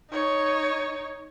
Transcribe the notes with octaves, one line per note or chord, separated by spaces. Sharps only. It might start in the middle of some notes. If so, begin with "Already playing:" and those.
D#4 C#5